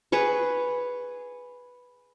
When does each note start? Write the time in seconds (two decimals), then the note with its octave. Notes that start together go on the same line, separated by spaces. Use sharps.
0.12 G#4 B4 C#5